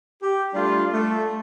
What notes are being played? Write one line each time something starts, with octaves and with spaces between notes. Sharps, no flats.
G4
G3 A3 D4 F4
A3